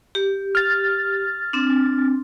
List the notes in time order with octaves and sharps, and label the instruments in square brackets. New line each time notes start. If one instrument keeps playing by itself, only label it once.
[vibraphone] G4
[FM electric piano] F6 A6
[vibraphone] C4 D4